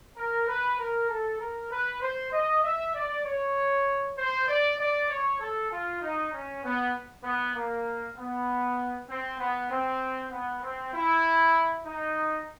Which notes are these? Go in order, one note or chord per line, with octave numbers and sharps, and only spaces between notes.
A#4
B4
A#4
A4
A#4
B4
C5
D#5
E5
D5
C#5
C5
D5
D5
C#5
A4
F4
D#4
C#4
B3
B3
A#3
B3
C4
B3
C4
B3
C4
E4
D#4